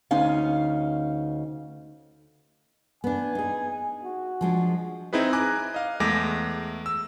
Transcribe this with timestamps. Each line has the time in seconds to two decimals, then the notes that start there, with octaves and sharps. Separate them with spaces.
0.11 D2 C#4 D#4 F5
3.04 B3 D4 G#5
3.35 D#4 G#4
4.03 F#4
4.41 F3 G#3 D4
5.13 C4 D#4 E4 G#4 B4
5.33 G#5 A#5 D6 F#6
5.74 D#5 F5
6.00 E2 G#3 A3 D6 A#6
6.86 E6